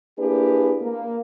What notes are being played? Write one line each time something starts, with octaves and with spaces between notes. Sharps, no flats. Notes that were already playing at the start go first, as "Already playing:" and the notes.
A#3 D4 E4 G4 G#4 B4
A#3